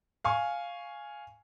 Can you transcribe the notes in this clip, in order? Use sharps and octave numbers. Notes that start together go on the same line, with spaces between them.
F5 G#5 C#6